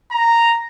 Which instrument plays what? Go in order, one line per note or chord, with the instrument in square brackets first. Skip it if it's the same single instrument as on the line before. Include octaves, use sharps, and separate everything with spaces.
[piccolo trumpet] A#5